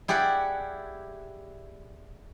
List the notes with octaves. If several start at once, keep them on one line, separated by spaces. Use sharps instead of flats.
E4 G4 G#4 D5 F#5